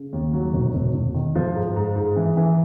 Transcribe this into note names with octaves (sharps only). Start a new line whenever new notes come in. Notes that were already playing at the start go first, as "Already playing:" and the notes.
Already playing: C#3
D#2
F#3
E1
E1
E1
D#3
F3
G#2
G#2
G#2
E3
E3